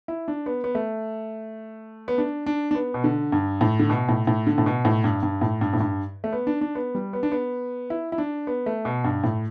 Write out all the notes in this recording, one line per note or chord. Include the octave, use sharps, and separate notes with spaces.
E4
D4
B3
B3
A3
B3
D4
D4
D4
B3
B2
D3
G2
A2
D3
B2
A2
A2
D3
A2
B2
A2
G2
G2
A2
G2
A2
G2
A3
B3
D4
D4
B3
G3
B3
D4
B3
E4
E4
D4
B3
A3
B2
G2
A2